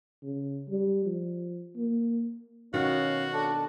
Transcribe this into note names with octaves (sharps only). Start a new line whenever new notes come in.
C#3
G3
F3
A#3
B2 D#3 C#4 F#4 F5 F#5
D4 A4